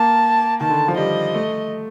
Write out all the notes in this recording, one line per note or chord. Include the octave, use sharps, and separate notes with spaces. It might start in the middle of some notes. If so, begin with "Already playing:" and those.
Already playing: A#3 A5
D#3 A5
D3
F3
G3 D#5
A3